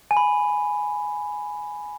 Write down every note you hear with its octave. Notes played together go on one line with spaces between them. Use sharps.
G#5
B5